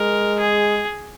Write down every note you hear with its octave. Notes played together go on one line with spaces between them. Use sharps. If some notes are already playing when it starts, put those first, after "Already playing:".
Already playing: G#3 A#4
G#4